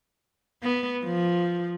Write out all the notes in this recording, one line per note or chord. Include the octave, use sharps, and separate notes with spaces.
B3
F3